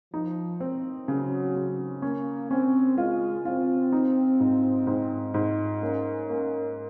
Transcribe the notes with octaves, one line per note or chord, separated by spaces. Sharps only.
F3 D#4
C4
C#3 F#3
C#3
A#3 C#4
C4 C#4
G#3 F4
C4 F4
D#4
G#2
G#2
G#2
A#3 C#4
A#3